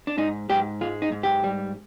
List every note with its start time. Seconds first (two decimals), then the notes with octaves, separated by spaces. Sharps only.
0.07 D4
0.18 G#2 D#4
0.50 G#2 G4
0.81 G#3 F4
1.02 D#4
1.12 G#2
1.23 G4
1.44 G3